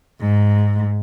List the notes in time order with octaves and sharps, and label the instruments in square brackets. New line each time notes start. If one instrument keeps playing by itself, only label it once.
[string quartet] G#2